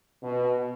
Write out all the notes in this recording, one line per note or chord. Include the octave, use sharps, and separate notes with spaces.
B2